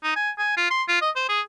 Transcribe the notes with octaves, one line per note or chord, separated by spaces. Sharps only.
D#4
G#5
G#5
F4
C6
F4
D#5
C5
G#4